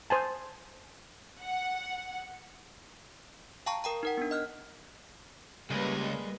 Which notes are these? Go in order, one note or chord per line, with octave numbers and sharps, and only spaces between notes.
C5 G#5 A5
F#5
F5 G5 A5 A#5 C#6
A#4 G5 A#5
D#4 A#4 F#5
B3 D4
D#5 F6 F#6
C#2 G3 G#3 A#3 A#4 B4 D#5